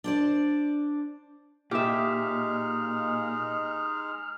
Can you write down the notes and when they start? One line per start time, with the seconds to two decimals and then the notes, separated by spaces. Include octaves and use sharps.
0.04 D4 C5 D5
1.71 A#2 G#3 D#4 G4 G#4 E5 F6